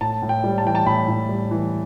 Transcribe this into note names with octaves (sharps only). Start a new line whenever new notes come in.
A2 A5
A2
G5
G3
A5
E3 G5
A5
A2 B5
A2
G3
E3